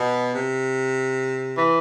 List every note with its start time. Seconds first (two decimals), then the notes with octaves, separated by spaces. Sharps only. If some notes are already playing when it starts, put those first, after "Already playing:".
Already playing: B2
0.32 C3
1.56 E3